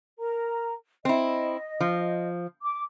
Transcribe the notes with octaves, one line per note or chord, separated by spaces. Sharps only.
A#4 A#5
C4 E4 D#5
F3
D6